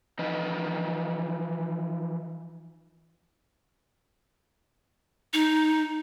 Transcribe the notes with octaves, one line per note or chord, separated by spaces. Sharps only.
E3 F3 D#4 B4 D#5
D#4